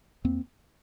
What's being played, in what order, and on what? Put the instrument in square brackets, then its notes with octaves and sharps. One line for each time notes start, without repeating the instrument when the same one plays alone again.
[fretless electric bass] E2 A#3 C4